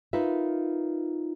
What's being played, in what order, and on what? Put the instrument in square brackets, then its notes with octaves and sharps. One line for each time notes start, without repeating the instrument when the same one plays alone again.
[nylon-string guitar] D#4 F4 A#4 B4 E5